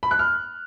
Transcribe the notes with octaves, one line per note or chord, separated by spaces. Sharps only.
B5
F#6
F6